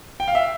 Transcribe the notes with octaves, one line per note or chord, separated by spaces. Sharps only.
G5
F5
E5